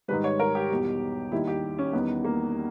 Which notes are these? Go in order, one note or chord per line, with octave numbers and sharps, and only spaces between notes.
G#2 D#3 G3 B4
C#5
A#4
G4
E2 B2 G3
D#2 D#3 G3 E4
G4
C#4
E2 D#3 G3 B3
A#3